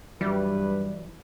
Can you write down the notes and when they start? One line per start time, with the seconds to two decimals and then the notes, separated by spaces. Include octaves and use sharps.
0.21 G2 E3 F#3 G3 B4